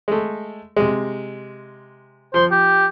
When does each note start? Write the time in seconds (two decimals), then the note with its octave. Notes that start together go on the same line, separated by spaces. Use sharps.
0.08 G#3 A3
0.77 C3 G#3
2.34 F3 C5
2.51 G4